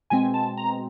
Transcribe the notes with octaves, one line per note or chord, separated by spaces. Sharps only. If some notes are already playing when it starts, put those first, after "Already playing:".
B2 G#3 C4 G#5
A5
A#5